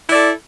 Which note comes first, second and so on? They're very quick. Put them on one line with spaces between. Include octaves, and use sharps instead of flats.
E4 D5 A4